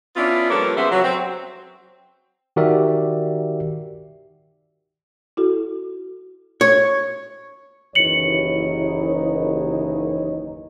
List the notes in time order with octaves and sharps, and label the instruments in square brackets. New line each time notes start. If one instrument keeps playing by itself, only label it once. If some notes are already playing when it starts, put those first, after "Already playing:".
[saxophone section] B3 C#4 D4 E4 F4
F3 G3 A#3 C#4 A4 B4
C#3 G#3 B3 C5 E5
F#3
C4
[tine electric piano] D#3 F#4 G4 A#4 D5 E5
[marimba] E4 F#4 A4
[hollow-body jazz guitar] C#5
[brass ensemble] F#1 D#2 D#4 [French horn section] E3 B4 C#5 [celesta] C#7 F#7